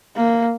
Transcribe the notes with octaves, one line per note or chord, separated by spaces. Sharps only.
A#3